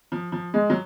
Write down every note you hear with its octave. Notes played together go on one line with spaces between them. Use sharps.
F3
F3
G#3
F#3